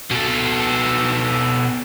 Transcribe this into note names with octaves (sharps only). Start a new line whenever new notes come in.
B2 A4